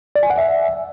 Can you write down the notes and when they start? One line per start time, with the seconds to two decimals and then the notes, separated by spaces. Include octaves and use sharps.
0.16 D5
0.23 G#5
0.30 F#5
0.38 E5